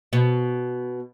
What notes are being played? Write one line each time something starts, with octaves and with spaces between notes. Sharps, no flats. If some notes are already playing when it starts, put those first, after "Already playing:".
B2